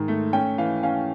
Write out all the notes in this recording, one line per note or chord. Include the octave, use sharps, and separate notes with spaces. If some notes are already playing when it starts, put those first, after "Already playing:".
Already playing: G#2 D#3
A3
C#4 G5
E3 F5
C#4 F5